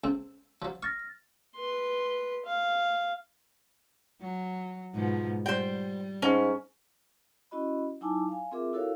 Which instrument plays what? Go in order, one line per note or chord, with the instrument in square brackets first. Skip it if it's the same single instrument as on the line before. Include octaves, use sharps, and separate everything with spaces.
[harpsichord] C#2 C4
F3 F#3
[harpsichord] C#6 [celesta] F6 A6 A#6
[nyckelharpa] B4 C6
F5
[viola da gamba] F#3
G#2 B2 F3
[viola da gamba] G3 [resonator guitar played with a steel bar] C5 G5
[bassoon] G#2 [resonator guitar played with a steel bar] C#4
[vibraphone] C#4 E4 F#4 D#5 B5
F#3 D#4 E4 G#5 A5 D6
F5 G#5
C4 F4 G#4 A#4 E5 D6
E4 F#4 A4 A#4 C#5 F5